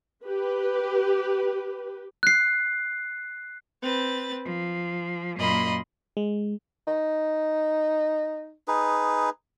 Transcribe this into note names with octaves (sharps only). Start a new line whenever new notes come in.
G4 B4
F#6 C7
C4 B4 A6
F3
F#2 A#2 A#3 D#5 B5 C6
G#3
D#4
D#4 G#4 B4